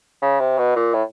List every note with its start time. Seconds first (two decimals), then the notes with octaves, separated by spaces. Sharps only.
0.22 C#3
0.40 C3
0.58 B2
0.76 A#2
0.94 A2